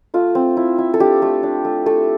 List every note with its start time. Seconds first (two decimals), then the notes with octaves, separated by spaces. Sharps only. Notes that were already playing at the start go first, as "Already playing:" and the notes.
0.14 A3 F4
0.35 C4
0.57 E4
0.78 E4
0.94 A4
1.00 D4 G4
1.22 A3
1.43 D4
1.65 A3
1.86 A3 A4